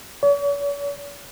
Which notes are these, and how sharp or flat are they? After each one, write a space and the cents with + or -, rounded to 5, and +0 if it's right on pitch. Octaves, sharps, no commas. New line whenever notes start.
C#5 +45